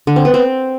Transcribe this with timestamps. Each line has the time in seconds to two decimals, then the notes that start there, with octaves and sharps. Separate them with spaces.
0.07 D3
0.16 C4
0.25 B3
0.34 C4